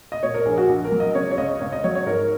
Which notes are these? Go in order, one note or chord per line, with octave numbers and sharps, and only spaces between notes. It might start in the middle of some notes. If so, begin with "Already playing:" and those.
D#5
A#2 C#5
A#4
A#1 G#4
F#4
A#1
A#4
F#3
D#5
C#3 C#5
C#5
C#2 D#5
C#2 C#5
D#5
F#3 C#5
C#5
G#2 A#4